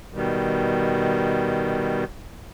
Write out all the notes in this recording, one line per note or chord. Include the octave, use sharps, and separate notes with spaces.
B2 D#3 G3